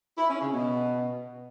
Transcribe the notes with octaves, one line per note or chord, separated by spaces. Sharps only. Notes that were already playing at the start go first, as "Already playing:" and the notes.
E4
C#4
C#3
B2